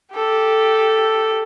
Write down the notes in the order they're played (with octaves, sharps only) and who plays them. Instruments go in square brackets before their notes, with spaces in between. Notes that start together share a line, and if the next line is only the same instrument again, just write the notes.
[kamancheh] G4 A4